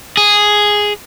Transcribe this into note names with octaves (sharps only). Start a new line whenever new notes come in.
G#4